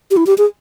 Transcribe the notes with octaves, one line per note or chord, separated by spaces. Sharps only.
G4
E4
G4
G#4